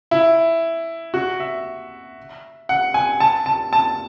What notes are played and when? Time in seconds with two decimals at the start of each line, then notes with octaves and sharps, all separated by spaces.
0.11 E4
1.14 F#4
1.40 E5
2.69 F#5
2.94 G#5
3.20 A5
3.46 A5
3.73 A5